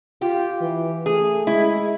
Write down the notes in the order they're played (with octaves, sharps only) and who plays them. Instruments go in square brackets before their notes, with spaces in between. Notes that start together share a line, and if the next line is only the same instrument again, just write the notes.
[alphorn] F4 [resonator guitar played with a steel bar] G4
[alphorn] E3
[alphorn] A3 [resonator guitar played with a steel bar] G#4
[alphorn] G#3 [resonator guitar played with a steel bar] E4